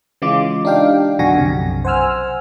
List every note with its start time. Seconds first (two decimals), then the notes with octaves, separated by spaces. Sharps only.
0.22 C#3 E3 G#3 F4 D6
0.65 D4 D#4 G4 F5 G5
1.19 B1 F2 D3 F#4 G#5 A#6
1.38 B1 F#2 C3
1.85 C5 F#5 G#5 E6 F6